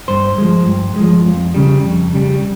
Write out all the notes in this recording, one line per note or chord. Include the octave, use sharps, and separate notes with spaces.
G2 C5
F3 G#3
G2
F3 G#3
F2
C#3 G3
F2
C#3 G3